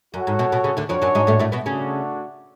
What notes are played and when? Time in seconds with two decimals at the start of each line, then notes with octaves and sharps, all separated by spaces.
0.14 F#2 F#4 A4 C#5 F#5
0.27 G#2
0.39 B2
0.52 B2
0.64 C#3
0.77 D2 D3
0.89 F2 F3 D4 F#4 C#5
1.02 F#2 F#3
1.15 G#2 G#3
1.27 A2 A3
1.39 A2 A3
1.52 B2 B3
1.66 C#3 A3 C#4 D4 F#4